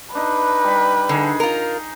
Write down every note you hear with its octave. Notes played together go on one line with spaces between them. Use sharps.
D4 D#4 B4
G3 B5
D3 D#4 G#4
F4 A#4